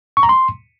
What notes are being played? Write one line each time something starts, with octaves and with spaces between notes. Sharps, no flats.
C#6
A#5
C6